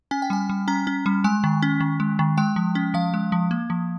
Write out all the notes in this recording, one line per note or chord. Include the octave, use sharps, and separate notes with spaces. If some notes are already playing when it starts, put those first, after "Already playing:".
C#4 G#5
G5
G3 G#5
G3
C#4 A#5
C#4
G3
G#3 G#5
D#3
C#4
D#3
G#3
D#3
G#3 G5
F3
C#4
F3 F5
G#3
F3
A#3
F3